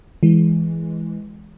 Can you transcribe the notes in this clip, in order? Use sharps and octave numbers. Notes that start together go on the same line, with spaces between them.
E3 G#3